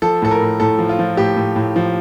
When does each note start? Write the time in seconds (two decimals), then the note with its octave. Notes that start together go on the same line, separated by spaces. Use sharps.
0.02 F3 A4
0.22 A2 A4
0.31 A#4
0.41 A2
0.60 A2 A4
0.79 F3
0.89 F4
0.99 F3
1.17 A2 G4
1.36 A2
1.56 A2
1.76 F3